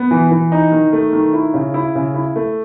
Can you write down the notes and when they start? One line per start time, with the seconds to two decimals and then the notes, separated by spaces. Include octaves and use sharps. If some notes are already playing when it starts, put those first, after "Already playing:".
Already playing: B3
0.11 E3
0.31 E3
0.52 D#4
0.72 D#3
0.93 A3
1.13 D#3
1.33 E4
1.54 C#3
1.74 E4
1.95 C#3
2.14 E4
2.36 A3